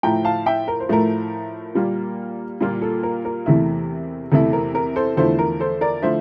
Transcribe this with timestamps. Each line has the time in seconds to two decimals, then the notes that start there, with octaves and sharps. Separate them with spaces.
0.03 A2 F3 A3 E4 G5 A#5
0.25 F5 A5
0.46 E5 G5
0.68 A#4
0.80 C5
0.89 A2 F3 A3 E4 A#4
1.75 A#2 G3 A#3 F4
2.61 A#2 G3 A#3 F4
2.82 A4
3.03 A#4
3.25 A#4
3.46 E2 C3 E3 A3 E4
4.32 E2 C3 E3 A3 E4 A4
4.53 A#4
4.75 A#4
4.96 A4 C5
5.17 E2 D3 F3 A3 E4 A4 C5
5.39 A#4
5.60 A4 C5
5.81 A#4 D5
6.02 D3 F3 A3 E4 C5 E5